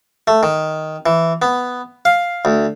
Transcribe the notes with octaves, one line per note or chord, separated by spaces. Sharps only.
A3
D#3
E3
B3
F5
D2